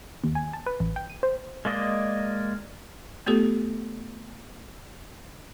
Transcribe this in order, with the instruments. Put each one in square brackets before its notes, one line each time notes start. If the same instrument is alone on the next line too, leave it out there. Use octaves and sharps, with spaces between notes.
[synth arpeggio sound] D#2
G#5
A5
B4
A1
G5
D#7
C5
[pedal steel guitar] G#3 A#3 D5 D#5
[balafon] A3 B3 F4 G4 A4